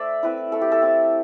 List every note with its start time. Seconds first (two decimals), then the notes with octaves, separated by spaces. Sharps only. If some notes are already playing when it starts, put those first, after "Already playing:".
Already playing: A3 C5 D5 E5
0.23 C4 E4 B4
0.52 A3 A4
0.61 G4
0.72 A4
0.82 C4 E4